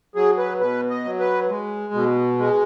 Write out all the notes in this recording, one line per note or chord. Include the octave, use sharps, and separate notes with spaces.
F#3 G#4
B4
B2 B4
D#5
F#3
B4
G#3
B2
G#3